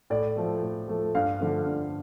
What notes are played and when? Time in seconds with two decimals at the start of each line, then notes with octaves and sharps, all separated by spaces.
0.10 A2 D5
0.36 F3 A3
0.63 A2
0.88 F3 A3
1.15 G2 F5
1.40 D3 F3 A3
1.66 G2